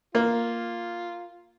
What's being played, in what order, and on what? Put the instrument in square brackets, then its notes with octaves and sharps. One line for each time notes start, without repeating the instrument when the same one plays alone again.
[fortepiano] A#3 [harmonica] F4